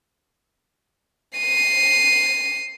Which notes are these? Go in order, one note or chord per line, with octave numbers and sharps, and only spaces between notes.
C7 D#7